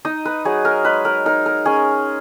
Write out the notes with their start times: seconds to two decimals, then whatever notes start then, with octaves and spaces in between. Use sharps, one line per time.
0.05 D#4 D#5
0.25 B4
0.45 F#3 G#4
0.65 A#4
0.85 G#3 B4
1.05 A#4
1.26 D#4 A#4
1.46 A#4
1.66 C#4 G#4